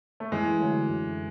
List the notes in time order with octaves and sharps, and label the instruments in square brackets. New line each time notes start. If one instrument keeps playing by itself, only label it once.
[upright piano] A3
[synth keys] F#2 [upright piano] E3 G#3
[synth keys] D3 F#3 A3
F#2